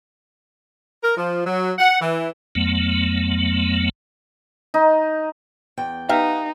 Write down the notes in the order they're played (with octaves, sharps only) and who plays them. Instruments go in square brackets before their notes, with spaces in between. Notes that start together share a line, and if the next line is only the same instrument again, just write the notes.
[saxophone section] A#4
F3
F#3
F#5
E3
[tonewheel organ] F2 F#3 A3 B3
[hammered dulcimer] D#4
[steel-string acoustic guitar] E2 G5
[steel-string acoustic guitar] B3 [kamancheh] D#4 [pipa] G4 E5 F5